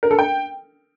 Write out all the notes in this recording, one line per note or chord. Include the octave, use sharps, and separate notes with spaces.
A#4
A4
G5